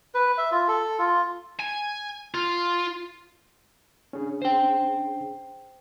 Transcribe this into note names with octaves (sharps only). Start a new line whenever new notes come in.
B4
E5
F4
A4
F4
G#5
F4
C#4 D4 G#4
C5 G5